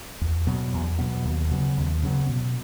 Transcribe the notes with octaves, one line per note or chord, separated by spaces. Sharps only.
E2
B2 F#3 B3
E2
B2 F#3 B3
D#2
C#3 F#3 B3
D#2
C#3 F#3 B3
B2